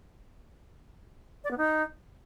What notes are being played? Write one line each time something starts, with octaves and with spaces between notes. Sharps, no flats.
D5
B3
D#4